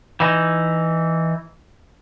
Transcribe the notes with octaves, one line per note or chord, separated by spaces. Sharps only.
E3 D#4